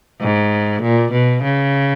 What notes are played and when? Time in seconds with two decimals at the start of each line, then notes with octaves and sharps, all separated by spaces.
0.21 G#2
0.82 A#2
1.12 B2
1.43 C#3